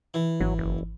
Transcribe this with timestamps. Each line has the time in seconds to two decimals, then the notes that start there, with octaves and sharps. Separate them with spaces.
0.14 E3
0.41 G#1 F#3
0.58 F#1